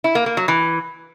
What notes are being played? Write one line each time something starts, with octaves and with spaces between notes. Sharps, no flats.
E4
A#3
A#3
F#3
E3